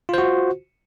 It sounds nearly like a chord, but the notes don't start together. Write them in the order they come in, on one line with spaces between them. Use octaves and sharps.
F4 C5 F#4